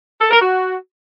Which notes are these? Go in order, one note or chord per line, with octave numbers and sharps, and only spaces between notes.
A4
A#4
F#4